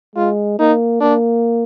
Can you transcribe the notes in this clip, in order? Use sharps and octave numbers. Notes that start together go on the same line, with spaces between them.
G#3 F4
A#3 D#4
A#3 D4